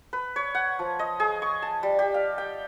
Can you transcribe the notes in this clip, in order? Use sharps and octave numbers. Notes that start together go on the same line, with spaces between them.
B4
C#5
F#5
F3
D#5
G#4
C#6
A5
G3
G4
F5
G5